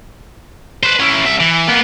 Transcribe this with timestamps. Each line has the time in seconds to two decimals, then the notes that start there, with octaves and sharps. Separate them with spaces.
0.83 B4 C5
1.00 C#4 E4
1.25 C2 E5
1.40 E3
1.68 A#3 B3